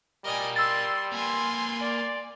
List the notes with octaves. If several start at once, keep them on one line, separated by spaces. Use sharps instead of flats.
G3 A#4 D5 D#5 G#5
C6 E6 A6
A#3 B4 G#5 C6
D5